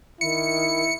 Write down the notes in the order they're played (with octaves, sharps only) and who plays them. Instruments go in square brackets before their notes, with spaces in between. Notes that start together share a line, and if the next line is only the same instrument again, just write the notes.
[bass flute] D#3 [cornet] E4 [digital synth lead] C#7